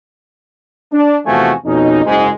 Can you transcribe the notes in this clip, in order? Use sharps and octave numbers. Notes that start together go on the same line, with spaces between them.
D4
E2 C3 F3 A3 F#4 G#5
F2 B2 C#4 D#4
F#1 G#2 G#3